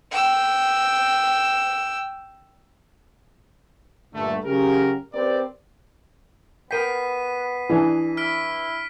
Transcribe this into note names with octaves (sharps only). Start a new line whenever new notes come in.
G5 E6
G2 A#2 D3 G3 A3
C#3 F#3 G4 A#4
C4 G4 A#4 B4 D5
B3 A#4 G5 B6 C7 D#7
E3 D4 G#4 G#5
E4 F6 B6 D7